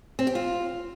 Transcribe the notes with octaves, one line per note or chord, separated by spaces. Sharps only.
C4
G4
F4